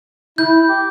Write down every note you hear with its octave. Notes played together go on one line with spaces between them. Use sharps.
E4 G6
G4